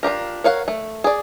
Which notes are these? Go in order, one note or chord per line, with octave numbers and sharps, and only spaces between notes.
D4 F4 G4 A#4
A#4 C#5 F5 F#5
A3
G#4 D5